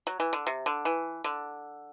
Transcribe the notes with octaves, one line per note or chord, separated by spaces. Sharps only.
F#3
E3
D3
C3
D3
E3
D3